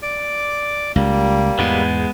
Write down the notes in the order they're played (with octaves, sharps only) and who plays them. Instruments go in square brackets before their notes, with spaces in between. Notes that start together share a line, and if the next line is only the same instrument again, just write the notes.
[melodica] D5 D6
[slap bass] C#2 [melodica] G3 A#3
[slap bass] E2 G#2 [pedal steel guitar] G#3 B3